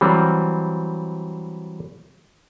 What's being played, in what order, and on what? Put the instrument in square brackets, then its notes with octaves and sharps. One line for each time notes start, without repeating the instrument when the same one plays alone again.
[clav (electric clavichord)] E3 F#3 G3 C4